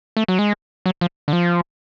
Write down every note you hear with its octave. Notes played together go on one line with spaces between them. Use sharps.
A3
F#3
G#3
F#3
F3
D3
F3